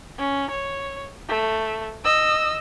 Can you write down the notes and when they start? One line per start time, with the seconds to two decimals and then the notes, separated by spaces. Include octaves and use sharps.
0.19 C#4
0.51 C#5
1.29 A3
2.04 D#5 E6